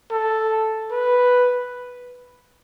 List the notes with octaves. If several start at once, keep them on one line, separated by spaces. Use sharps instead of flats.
A4
B4